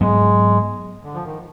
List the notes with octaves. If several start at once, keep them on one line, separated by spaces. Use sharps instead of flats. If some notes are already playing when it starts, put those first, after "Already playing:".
G#2 F#3 G#3 B3
D3
F3
D#3